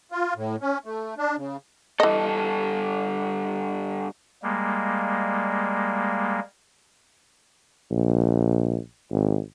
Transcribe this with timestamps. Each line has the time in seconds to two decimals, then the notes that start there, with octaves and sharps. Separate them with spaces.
0.12 F4
0.36 A2
0.62 C#4
0.85 A3
1.18 D4
1.37 C#3
2.00 G2 E3 A4 D#5
4.43 G3 G#3 A#3
7.90 A#1
9.11 G#1